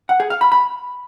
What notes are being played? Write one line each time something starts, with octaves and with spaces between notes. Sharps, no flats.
F#5
G#4
F5
B5
B5